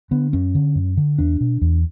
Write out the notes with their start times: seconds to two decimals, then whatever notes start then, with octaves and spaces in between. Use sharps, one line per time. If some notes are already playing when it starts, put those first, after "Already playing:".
0.11 D3 B3
0.33 F#2 C#4
0.55 D3
0.75 F#2
0.97 D3
1.18 E2 D4
1.41 B2
1.62 E2